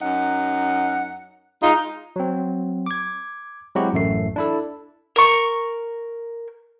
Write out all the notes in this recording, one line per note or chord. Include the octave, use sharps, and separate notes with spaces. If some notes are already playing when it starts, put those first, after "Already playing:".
F#2 D#4 F#5
G#3 D#4 F4
F#3 C4
D6 G#6
F#3 G#3 C4 E4 F#4 G4
A1 F#2 A3 C7
D4 E4 A4
A#4 C#6